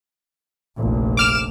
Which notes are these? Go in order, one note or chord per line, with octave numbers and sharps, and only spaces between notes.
F1 A#1
D6 F6 E7